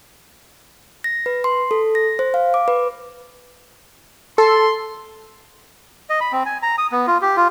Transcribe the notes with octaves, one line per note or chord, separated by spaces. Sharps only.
A#6
B4
C6
A4
A#6
C5
F5
D6
B4
A4 C6
D#5
B5
C4
G#5
A#5
D#6
B3
F4
G4
F4